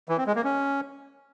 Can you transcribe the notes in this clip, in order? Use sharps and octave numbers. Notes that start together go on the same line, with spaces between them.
E3
C4
G#3
A#3
C#4